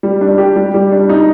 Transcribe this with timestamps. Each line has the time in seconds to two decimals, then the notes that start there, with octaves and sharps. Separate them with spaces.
0.03 G3
0.21 D4
0.38 G4
0.56 G3
0.74 G3
0.92 D4
1.09 D#4